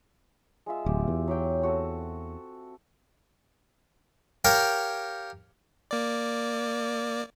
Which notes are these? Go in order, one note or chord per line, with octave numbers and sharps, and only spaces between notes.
G#3 F4 E5
D1 G4
E2
F#3 G4 G5
C4 F#4 A4
G4 A#4 C#5 F5 G5
A#3 D5